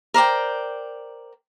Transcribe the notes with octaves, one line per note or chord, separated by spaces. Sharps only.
A#4 C5 D5 G5